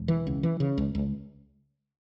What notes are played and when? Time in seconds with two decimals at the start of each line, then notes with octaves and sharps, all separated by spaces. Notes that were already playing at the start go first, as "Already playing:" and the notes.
Already playing: E1
0.08 E3
0.27 C#2
0.43 E3
0.60 C#3
0.78 C#2
0.95 C#2